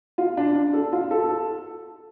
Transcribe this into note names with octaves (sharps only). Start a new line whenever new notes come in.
F4
D4
D4
A4
F4
A4
A4